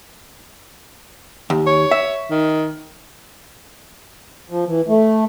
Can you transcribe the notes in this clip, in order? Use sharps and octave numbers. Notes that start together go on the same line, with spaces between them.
D#2
C#5
E5
D#3
F3
E3
A3